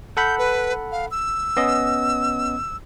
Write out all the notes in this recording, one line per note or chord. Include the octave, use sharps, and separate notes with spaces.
A4 F#5 B5 G6
B4
F5
E6
B3 C#4 D#5